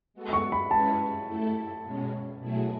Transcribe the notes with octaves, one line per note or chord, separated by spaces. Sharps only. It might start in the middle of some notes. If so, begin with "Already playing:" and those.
G#3 B3 F#4 A4
C#6
B5
G#3 C#4 E4 B4 A5
A3 E4 A4
B2 G#3 C#4
B2 F#3 A3 E4 G#4